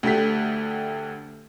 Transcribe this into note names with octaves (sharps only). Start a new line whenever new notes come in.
D2 D3 G4 B6